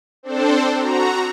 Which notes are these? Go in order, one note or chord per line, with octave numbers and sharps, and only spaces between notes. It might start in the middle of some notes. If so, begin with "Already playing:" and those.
C4 D4 A4 C5
F#4 A#5